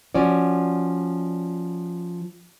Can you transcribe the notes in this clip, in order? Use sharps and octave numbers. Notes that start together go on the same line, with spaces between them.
F3 C#4 F#4 D5